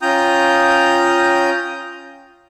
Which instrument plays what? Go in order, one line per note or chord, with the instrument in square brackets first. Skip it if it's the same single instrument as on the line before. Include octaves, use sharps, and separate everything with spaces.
[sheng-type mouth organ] C#4 F4 G5 A#5 D#6 G6